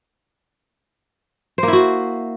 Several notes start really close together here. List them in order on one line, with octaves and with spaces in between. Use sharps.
C5 A#3 E4 F#4